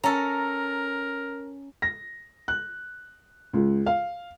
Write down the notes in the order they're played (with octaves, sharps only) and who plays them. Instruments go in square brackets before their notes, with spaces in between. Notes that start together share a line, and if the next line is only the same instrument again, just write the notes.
[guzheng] C#4 A4 [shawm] A#4 [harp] A#5
[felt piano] A#6
F#6
C#2
F5